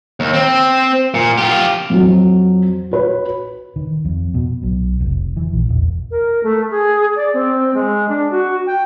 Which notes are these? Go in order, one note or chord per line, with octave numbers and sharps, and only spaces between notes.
D#2
C4
A#2
F4 G4
F2 F#3
F#4 B4 C#5
D#3
F2
B2
B1
F1
E3
A#1
E1
A#4
A3
G#4
D5
C4
G#3
D4
F#4
G5